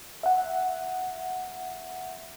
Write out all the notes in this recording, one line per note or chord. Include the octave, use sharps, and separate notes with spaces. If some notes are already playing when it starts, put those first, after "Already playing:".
E5 F#5